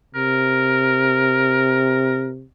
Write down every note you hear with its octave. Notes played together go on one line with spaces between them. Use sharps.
C3 A#4